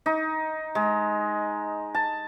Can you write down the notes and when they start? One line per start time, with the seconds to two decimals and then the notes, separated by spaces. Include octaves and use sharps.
0.06 D#4
0.75 G#3
1.95 A5